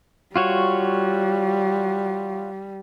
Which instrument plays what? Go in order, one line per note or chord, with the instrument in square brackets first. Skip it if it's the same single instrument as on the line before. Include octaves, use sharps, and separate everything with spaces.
[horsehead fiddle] G3 [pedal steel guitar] F4 F#4 C#5